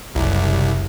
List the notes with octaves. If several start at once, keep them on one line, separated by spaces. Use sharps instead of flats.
F#1 C2